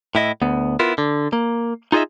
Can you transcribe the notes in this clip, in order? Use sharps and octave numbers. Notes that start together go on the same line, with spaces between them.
A2 E4 D#5
D2 B3
B3 E4 F4 A#4
D3
A#3
D#4 F4 G#4 B4 D#5 E5